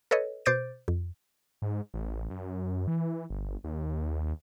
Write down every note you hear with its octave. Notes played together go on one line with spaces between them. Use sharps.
A4 B4 C#5 D#5
B2 C5 D6 G6 A6 D7
F2
G#2
A1
F#2
E3
G1
D#2